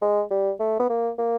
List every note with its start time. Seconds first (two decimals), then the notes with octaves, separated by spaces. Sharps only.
0.02 G#3
0.31 G3
0.60 A3
0.79 B3
0.90 A#3
1.18 A#3